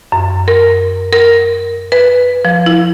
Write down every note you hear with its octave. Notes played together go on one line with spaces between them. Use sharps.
F#2
A#4
A#4
B4
F3
E4